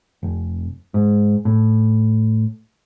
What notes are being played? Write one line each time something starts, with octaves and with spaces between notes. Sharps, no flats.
F1
G#2
A2